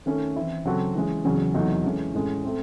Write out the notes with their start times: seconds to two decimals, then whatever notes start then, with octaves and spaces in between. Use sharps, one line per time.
0.06 D#3 A3 C#4
0.36 E3 C4 E4
0.65 C#3 F#3 C4 F#4 A4
0.95 E3 G#3 C#4
1.25 E2 C#3 F#3 C#4 G#4
1.54 E2 C3 F#3 A3 D#4
1.84 E3 G#3 C#4 E4 A4
2.14 A2 G#3 C#4
2.44 A3 C4